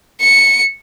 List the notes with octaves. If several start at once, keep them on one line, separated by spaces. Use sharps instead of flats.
C#7